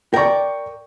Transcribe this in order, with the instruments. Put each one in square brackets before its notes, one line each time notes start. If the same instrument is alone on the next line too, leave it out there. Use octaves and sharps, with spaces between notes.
[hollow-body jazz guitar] A#4 D5 [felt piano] G5 C#6